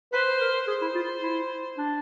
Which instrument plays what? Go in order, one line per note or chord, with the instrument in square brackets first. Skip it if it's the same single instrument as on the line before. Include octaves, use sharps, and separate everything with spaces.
[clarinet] B4 [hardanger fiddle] C5
[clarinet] A#4
[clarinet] G#4 [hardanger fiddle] C5
[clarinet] E4
F4
E4
D4